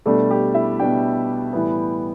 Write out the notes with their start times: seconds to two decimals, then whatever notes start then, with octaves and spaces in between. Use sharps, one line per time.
0.06 B2 G3 A3 D4 A4
0.31 G4
0.54 E4 E5
0.79 B2 G3 D4 G4 G5
1.53 A2 E3 G3 B3